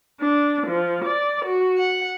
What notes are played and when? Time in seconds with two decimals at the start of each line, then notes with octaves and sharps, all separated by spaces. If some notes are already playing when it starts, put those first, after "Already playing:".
0.21 D4
0.68 F3
1.04 D5
1.45 F#4
1.77 F#5